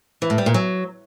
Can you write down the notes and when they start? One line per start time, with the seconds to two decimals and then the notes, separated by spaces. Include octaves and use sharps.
0.22 E3
0.30 A2
0.38 G3
0.46 A#2
0.54 F#3